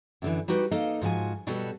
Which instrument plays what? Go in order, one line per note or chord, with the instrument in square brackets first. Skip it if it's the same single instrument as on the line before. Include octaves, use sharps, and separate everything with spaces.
[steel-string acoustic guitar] F#2 D3 E3
G3 D#4 F#4 G4 B4
A#3 D#4 A4 D#5 F5
G#2 F3 F#4 G#5
B2 F#3 G3 F#4 A4